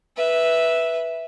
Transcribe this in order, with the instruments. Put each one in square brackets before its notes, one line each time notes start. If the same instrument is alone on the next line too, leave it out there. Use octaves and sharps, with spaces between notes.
[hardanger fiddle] B4 E5